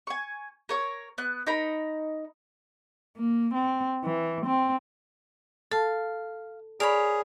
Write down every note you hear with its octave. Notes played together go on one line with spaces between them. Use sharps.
G#5 C#6
A#4 C#5 C#6
B3 F#6
D#4 A#4 A#5 B5
A#3
C4
E3
C4
A4 F5 A5
G#4 A#4 C#5 D5 B5